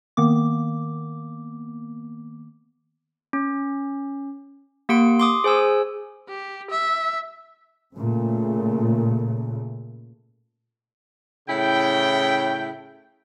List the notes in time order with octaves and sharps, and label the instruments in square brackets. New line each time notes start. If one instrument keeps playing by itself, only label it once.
[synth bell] D#3 A#3 B3 D6
[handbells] C#4
A#3 G4 F#5 C6 D7
C6 D6 D#6
G#4 C5 G#5 E6
[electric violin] G4
E5
[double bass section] A#2 C#3 A3
[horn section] A2 C#3 E4 G5